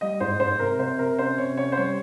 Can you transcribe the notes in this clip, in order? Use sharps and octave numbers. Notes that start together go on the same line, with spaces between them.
G3 D#5
G#2 C5
G#2 C5
C3 A#4
C3 C5
C3 A#4
C#4 C5
C3 C#5
C#4 C#5
C5
G3 C#5